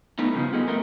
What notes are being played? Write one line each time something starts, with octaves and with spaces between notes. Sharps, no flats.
A3 B3 D#4
G2 C#3 F3
B3 G#4 A4 D#5
F2 A3 A#4